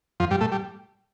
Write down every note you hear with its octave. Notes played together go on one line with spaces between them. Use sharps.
F2 F3
G2 G3
A2 A3
G3